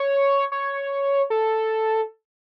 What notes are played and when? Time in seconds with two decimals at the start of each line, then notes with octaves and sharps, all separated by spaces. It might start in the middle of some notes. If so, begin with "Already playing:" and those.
Already playing: C#5
0.52 C#5
1.30 A4